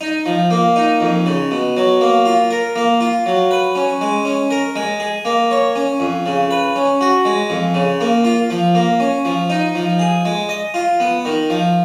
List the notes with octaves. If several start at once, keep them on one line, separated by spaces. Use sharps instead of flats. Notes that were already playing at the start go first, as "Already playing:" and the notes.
D#4
F3
A#3
D#4
F2
C#3
B2
F#3
A#3
F4
A#4
A#3
F4
F#3
B4
C#4
G#3
C#4
A#4
G#3
G#4
A#3
C#5
C#4
F2
C#3
B4
C#4
F#4
G#3
F2
C#3
A#3
F4
F3
A#3
C#4
F3
D#4
F3
G#4
G#3
D#5
F4
B3
D#3
F3